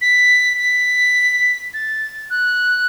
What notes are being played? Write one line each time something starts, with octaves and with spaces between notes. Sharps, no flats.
B6
B6
A6
F#6